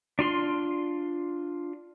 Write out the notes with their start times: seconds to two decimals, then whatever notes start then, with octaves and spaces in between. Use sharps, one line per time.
0.19 D4 F4 C6